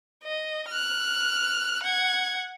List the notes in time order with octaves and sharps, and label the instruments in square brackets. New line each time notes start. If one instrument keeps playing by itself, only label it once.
[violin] D#5
F6 F#6
F#5 G#6